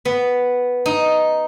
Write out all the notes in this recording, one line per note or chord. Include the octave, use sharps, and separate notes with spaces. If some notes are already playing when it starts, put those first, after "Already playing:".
B3
D#4